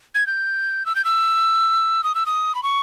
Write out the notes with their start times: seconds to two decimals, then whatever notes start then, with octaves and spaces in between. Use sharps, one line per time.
0.15 G#6
0.27 G6
0.86 E6
0.95 G6
1.05 E6
2.04 D#6
2.15 E6
2.26 D#6
2.55 B5
2.63 C#6